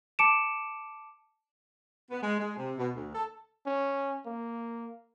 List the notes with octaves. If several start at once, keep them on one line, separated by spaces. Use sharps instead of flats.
A5 D6 C#7 D7 E7
B3
G#3
G#3
C3
B2
D2
A4
C#4
A#3